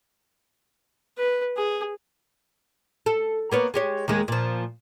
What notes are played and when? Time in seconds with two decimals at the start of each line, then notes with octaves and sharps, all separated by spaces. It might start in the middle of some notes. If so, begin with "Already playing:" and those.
1.17 B4
1.57 G#4
3.06 A4
3.52 A#3 B3 C#5
3.74 G#3 G4 C#5
4.08 D#2 D#3 G#3
4.28 A#2 F3